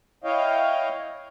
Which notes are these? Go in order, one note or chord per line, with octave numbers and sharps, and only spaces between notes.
E4 C#5 D#5 F5 G5